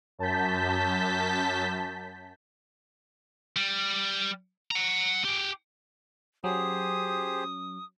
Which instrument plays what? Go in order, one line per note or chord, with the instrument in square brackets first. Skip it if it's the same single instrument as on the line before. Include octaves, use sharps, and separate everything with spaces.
[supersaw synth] F#2 A5 G6 B6
[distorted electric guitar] G3
F#5 A#5
G4 G#4
[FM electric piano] F#3 C#4 [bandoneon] G4 G#4 C5 [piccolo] D#6